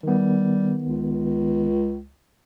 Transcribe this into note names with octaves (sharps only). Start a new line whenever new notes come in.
D#3 G3 B3
C#2